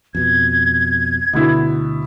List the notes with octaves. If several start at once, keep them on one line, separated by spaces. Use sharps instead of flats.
F2 B2 G#6
D2 B2 D3 E4